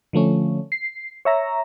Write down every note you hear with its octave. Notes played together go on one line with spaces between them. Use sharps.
D3 F3 A3 C#4
C7
C#5 E5 A#5